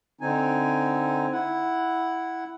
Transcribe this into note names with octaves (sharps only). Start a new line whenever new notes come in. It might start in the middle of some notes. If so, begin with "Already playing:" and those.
D3 C4 D#4 G#5
E4 F#5